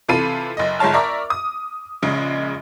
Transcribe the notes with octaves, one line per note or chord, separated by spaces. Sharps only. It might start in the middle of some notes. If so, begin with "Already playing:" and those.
C3 E3 F4 A4 B5 D#7
F#1 D#5
G1 G#2 G#3 C#5 A5 F6
A#4 D5 E5 A#5 C#6 D6
D#6
A#1 C#3 G#3